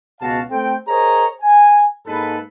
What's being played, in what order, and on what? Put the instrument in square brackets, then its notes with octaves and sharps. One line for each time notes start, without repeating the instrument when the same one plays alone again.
[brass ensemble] C#2 B2 B3 F#4 F5 A5
A3 C4 G5
G#4 A#4 C5 C#5 D#5 A#5
G#5
G#2 A#3 D#4 A4 B4